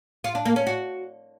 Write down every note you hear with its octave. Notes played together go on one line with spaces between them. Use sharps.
F4
D4
A#3
C#4
F#4